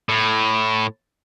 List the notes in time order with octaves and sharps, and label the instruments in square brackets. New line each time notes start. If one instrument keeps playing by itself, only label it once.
[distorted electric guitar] A2